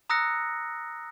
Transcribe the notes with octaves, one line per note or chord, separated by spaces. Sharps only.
A#5 D#6 E6 F#6 A#6 C#7